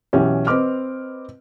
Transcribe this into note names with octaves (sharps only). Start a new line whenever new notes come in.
B1 E3 C#4 G4
C4 B4 D#5 D6 F6